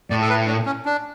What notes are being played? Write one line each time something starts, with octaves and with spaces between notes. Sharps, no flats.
A2 D5
A4
B4
D4
C#4
D4